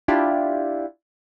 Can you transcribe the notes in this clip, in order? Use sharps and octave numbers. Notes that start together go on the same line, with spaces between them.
D4 E4 F4 G4